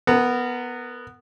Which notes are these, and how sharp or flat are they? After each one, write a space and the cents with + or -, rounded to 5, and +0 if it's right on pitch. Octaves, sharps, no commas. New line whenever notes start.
B3 +0 A#4 -25